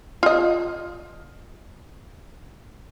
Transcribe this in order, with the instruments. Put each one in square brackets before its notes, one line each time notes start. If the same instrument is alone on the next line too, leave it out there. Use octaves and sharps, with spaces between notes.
[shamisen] F4 D#5